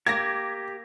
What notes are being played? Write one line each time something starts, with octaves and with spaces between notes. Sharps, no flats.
A#3 G4 G#6 A#6